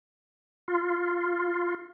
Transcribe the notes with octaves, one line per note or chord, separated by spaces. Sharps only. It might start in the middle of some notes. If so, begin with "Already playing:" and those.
F4